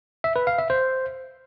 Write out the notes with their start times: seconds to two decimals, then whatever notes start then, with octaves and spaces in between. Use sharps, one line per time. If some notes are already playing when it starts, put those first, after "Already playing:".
0.24 E5
0.36 B4
0.47 F5
0.58 E5
0.70 C5